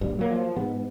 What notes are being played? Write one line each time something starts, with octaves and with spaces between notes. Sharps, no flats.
D#1 A#1 G2
F#3 A#3
F3
G#2 B3